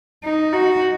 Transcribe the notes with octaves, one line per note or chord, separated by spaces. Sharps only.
D#4
F#4